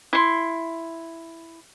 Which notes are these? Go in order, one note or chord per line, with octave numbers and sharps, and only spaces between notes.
E4 C6